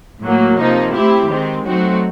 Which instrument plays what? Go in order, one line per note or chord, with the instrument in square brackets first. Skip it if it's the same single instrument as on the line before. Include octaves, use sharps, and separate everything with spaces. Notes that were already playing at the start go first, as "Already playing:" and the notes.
[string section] A2 F#3 A#3
C3 F3 A#3 D#4
A3 C4 E4 G4
D#3 G#3 C4
F#3 A3 C4 D#4 F#4